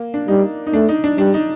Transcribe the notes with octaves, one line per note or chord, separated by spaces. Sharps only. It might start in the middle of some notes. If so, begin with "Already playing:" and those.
Already playing: A#3
D4
G3 D#4
D#4
A3 D4
D#4
D4
G3 D4
D#4